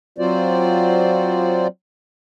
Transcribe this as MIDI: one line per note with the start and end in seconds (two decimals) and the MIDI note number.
0.18 1.67 54
0.18 1.67 60
0.18 1.67 65
0.18 1.67 66
0.18 1.67 72
0.18 1.67 74